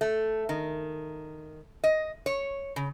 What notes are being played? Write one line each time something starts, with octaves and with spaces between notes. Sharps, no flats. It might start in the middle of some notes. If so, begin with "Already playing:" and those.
A3
D#3
D#5
C#5
C#3